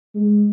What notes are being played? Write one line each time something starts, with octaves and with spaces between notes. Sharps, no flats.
G#3